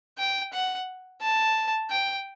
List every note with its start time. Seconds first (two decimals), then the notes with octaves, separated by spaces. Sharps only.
0.18 G5
0.53 F#5
1.22 A5
1.90 G5